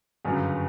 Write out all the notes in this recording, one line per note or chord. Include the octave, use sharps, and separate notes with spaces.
G1 F#2 C#3 F#3